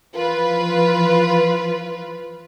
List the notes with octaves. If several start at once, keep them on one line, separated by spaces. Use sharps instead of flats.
E3 F3 F4 B4